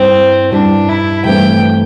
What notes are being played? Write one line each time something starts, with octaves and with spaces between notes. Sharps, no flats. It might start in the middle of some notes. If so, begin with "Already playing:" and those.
Already playing: G2 G3 C4 E4
G2 G3 D4 E4
E4
G2 E3 A3 C4 E4 G5